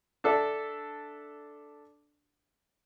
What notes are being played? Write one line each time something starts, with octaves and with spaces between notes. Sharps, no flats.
D4 A4 D5 E5